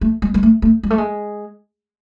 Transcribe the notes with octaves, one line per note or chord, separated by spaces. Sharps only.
A3
G#3
G#3
A3
A3
G#3
A3
G#3